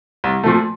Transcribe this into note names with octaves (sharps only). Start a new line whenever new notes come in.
C2
A#2 F3 A3